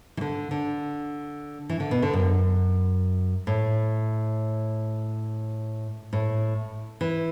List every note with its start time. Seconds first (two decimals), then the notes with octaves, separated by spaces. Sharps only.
0.17 E3
0.21 D3
0.51 D3
1.69 E3
1.80 D3
1.91 B2
2.02 D3
2.13 F#2
3.47 A2
6.13 A2
7.01 E3